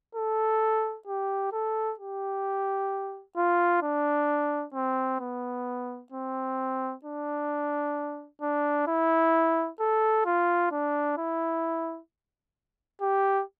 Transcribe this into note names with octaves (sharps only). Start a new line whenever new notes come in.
A4
G4
A4
G4
F4
D4
C4
B3
C4
D4
D4
E4
A4
F4
D4
E4
G4